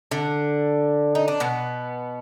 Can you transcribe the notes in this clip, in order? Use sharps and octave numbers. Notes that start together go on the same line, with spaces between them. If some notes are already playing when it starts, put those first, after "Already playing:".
D3 D4
D#4
D4
B2 B3